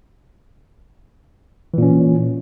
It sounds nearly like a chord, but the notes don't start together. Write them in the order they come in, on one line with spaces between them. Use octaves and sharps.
E3 A#2 C#4